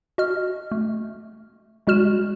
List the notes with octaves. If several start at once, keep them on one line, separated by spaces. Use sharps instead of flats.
F#4 D#5 F6
A3
G3 G#3 F#4 F6 E7